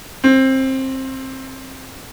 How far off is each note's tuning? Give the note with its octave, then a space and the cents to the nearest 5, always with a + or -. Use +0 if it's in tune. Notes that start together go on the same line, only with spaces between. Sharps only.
C4 +20